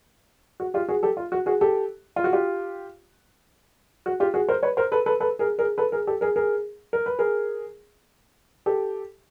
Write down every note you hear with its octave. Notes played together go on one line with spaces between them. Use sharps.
F#4
F4 G4
F#4 G#4
G4 A4
F4
F#4
F#4 G#4
G4 A4
F4
F#4
F4 G4
F#4
F4 G4
F#4 G#4
A#4 C5
B4 C#5
A#4 C5
A4 B4
A4 B4
A4 B4
G#4 A#4
G#4 A#4
A4 B4
G#4 A#4
G4 A4
G#4 A#4
G#4 A#4
A#4
B4
G#4 A#4
G4 A4